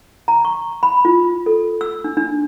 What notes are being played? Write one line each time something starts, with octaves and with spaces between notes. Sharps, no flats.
A#5
C#6
B5
F4
A4
E6
D4
D4